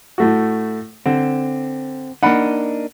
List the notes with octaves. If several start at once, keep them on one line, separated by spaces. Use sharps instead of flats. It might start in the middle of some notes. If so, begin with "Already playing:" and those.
A2 A3 F#4
D3 C4
A#3 D4 D#4 F#5 B5